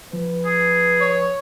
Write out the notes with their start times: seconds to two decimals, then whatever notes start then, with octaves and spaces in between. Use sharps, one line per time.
0.13 F3 B4
0.45 G#4
1.01 C#5